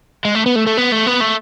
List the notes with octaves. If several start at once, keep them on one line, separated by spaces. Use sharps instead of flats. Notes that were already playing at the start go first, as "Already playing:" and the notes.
G#3
A3
B3
A3
A3
B3
A3
B3
A3